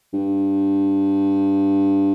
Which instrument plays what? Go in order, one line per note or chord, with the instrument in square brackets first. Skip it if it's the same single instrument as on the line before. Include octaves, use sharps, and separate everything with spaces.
[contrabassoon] G2